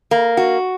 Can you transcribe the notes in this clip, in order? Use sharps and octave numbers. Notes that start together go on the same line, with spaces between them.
A#3
F#4